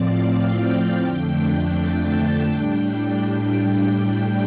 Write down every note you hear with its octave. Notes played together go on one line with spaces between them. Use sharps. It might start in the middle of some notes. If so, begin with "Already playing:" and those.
Already playing: A2 F3 C4 D5 F5
G5
F2 D3 A3 D4
A5
A2 G3 D4 G5